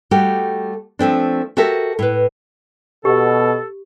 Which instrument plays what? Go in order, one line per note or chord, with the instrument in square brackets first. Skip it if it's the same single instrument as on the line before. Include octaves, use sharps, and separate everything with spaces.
[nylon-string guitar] G3 A3 F#4 G4
F3 A3 C4 D4
F#4 G4 A4 A#4 E5
A2 B4
[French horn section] B2 [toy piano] G4 [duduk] A4